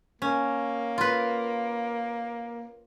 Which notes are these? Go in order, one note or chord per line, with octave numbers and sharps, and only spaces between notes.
A#3 C#4
F4 B4